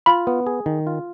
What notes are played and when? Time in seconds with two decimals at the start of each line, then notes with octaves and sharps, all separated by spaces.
0.06 F4 B5
0.27 B3
0.47 G#4
0.66 D#3
0.87 F4